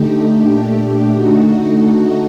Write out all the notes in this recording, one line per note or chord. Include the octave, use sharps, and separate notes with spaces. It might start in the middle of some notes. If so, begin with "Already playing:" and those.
Already playing: D3 A3 D#4 G4
A#2 A3 D4 G4
D3 A3 D#4 F#4